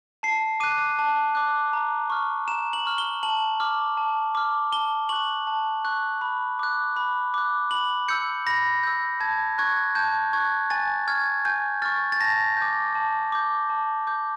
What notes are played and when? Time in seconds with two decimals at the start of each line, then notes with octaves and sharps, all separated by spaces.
0.23 A5 C7
0.60 D6 F#6 D#7
0.99 A5
1.35 D6 F#6
1.73 A#5
2.10 C#6 F6
2.48 A#5 E7
2.73 F#7
2.86 C#6 F6
2.98 G7
3.23 A5 F#7
3.60 D6 F6
3.97 A5
4.35 D6 F6
4.72 A5 G7
5.09 C#6 F#6 F#7
5.47 A5
5.85 C#6 F#6
6.21 B5
6.59 D6 F#6
6.97 B5
7.34 D6 F#6
7.71 B5 F#7
8.08 E6 G6 C#7
8.47 B5 A#6
8.83 E6 G6
9.20 A5 G#6
9.58 C#6 F#6 G#6
9.95 A5 G6
10.33 C#6 F#6 G#6
10.70 G#5 A6
11.08 C#6 F6 G#6
11.45 G#5 G6
11.82 C#6 F6 A6
12.12 A6
12.21 A5 A#6
12.57 D6 G6
12.95 A5
13.32 D6 G6
13.70 A5
14.07 D6 G6